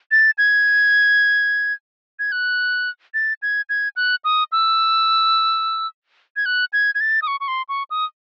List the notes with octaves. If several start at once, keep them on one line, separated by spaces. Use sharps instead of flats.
A6
G#6
G#6
F#6
A6
G#6
G#6
F#6
D#6
E6
G#6
F#6
G#6
G#6
A6
D#6
C#6
C#6
C6
C#6
D#6